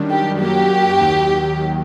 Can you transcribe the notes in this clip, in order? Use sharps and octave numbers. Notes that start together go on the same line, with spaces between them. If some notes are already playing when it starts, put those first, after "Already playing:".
Already playing: F#2 D#3 G3 D4
G4
F#2 F#3 A#3 F#4 G4
D#2 D#3 F#3